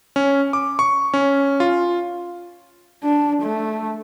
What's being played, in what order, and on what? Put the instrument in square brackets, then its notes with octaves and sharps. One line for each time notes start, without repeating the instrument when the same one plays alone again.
[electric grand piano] C#4
D6
C#6
C#4
F4
[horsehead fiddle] D4
A3